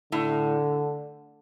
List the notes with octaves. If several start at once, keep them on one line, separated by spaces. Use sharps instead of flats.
A2 D3